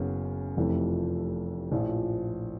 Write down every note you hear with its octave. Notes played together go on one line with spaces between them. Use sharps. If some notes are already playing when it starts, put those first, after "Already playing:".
Already playing: F#1 F#2 C#3 F#3 B3
F1 F2 C3 E3 A3
A#1 A2 F3